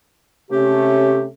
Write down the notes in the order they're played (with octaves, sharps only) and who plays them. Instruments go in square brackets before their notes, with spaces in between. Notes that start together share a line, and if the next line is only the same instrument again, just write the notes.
[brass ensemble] C3 A3 C#4 [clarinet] G4